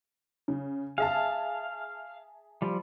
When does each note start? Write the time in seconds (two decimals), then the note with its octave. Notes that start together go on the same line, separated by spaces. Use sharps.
0.48 C#3
0.98 G#4 E5 F5 A5
2.62 F3 G3